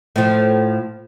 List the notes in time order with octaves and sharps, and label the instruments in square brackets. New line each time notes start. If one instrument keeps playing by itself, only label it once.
[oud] A2 F3